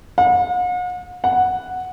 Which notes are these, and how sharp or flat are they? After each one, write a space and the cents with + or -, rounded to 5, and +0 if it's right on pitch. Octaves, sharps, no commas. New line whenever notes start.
F#5 -45
F#5 -5